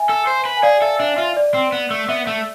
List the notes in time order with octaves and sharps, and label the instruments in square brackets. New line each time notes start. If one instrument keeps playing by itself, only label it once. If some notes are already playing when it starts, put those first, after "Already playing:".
Already playing: [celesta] E5 G#5
[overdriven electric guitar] A4
C5
B4
[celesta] G#5
[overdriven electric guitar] G#4 [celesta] D5 F5
[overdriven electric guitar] A4 [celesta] E5
[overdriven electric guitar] D4 [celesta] E5
[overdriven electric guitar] F4 [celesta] E5
[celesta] D5
[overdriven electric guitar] C4
B3
A3
[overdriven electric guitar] B3 [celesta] E5
[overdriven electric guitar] A3